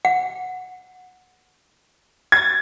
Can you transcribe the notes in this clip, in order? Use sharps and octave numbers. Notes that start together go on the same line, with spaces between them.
F#5
G#6 A6